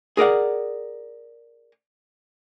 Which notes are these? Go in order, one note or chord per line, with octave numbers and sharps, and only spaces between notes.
G#4 A#4 D5 F#5